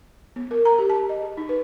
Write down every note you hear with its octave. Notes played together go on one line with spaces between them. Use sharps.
B3
A#4
A#5
G4
A5
D#5
G#4
D#4
B4